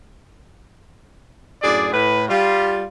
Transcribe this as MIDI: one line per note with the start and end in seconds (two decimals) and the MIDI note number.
1.62 1.89 42
1.62 1.89 45
1.62 1.89 62
1.62 1.89 68
1.62 1.89 74
1.93 2.24 45
1.93 2.24 71
2.28 2.84 55
2.28 2.84 65